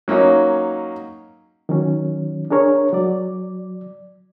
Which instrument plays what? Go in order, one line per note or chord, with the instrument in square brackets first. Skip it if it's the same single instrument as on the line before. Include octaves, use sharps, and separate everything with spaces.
[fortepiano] F#3 A#3 C#4 D#4
[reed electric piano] D#3 F#3 C#4
D4 G#4 A#4 C#5
F#3 D5